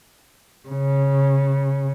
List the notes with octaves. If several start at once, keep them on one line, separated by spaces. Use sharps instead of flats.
C#3